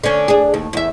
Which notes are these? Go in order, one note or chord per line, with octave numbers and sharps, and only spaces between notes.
D3 C#4
D4 G#4
D#2
E2 E5